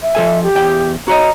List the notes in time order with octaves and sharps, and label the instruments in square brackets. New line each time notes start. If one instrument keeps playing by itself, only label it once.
[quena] E5
[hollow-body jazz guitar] F3 A4 G#5
[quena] G4
[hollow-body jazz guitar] E2 G5
[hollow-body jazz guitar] F#4 C#5 D#5 [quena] A#5